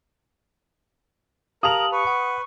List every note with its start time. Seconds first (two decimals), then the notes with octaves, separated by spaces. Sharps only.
1.63 G4 A#4 F5 A5 D#6 F7 F#7
1.92 B4 C#6
2.07 F#5